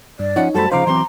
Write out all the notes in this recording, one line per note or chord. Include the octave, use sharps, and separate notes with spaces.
G2 D5
F3 C#4 D#4 C#5 F#5
F#2 G3 A3 F#4 A4 C5 A5 B5
C#3 F3 D#4 C5 F5 A#5 D6
E3 F#3 C4 C6